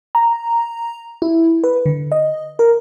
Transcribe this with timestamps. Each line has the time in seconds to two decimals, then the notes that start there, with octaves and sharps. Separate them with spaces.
0.15 A#5
1.22 E4
1.64 B4
1.86 D3
2.12 D#5
2.59 A#4